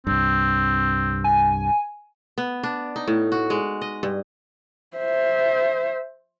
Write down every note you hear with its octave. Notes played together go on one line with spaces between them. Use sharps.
C2 G2 C4
G#5
B3
D4
D#4
A2
F#4
G#3
D#5
G2
C5 E5